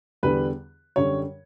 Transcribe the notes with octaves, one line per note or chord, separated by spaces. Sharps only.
E2 D3 G3 B4
F#2 D3 G3 C#5